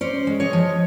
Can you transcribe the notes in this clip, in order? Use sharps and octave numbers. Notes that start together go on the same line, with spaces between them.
C#4 C5 D5
G#3
C#5 D#5
F3